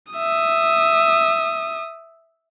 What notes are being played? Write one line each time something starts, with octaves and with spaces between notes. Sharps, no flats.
E5 D#6